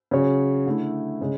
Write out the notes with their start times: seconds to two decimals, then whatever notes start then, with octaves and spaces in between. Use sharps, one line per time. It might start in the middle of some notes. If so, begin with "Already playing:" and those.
0.11 C#3 F#3 C#4 G#4 C#5
0.66 D3 A3 E4
1.21 C#3 G#3